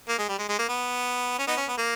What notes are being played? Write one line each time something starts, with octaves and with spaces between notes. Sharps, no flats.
A#3
G#3
G3
G#3
G#3
A#3
B3
C#4
B3 D#4
C#4
B3
A#3